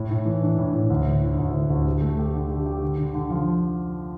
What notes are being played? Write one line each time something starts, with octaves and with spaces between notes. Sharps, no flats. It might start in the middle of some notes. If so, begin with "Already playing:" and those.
Already playing: A2
A2
E3
D4
A2
A2
D2
D3
E4
D2
D3
D2
G4
A3
G4
D3
G4
G4
D3
D3
D3
F3